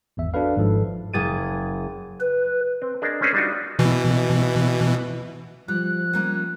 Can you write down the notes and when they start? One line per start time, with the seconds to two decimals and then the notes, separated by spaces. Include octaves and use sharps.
0.17 G#1 E2 E5
0.34 D4 F#4 A4 B4 F5
0.56 G#1 G#2 F3 A4
1.13 F#1 G#4 A6 D#7
2.20 B4
2.82 C4
3.02 D4 G#4 A#4 C5 D#5
3.21 C4 C#4 G#4 B4 C5
3.34 G3 D4 D#4 F4 F#4
3.79 B2 E3
5.68 F3 G3 F#6
6.13 G3 A#3 C#4